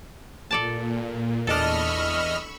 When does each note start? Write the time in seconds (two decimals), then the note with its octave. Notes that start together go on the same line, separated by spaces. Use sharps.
0.51 A#2 A4 D5 A5
1.47 E2 D4 A4 D#5 B5 C#6 E6 F6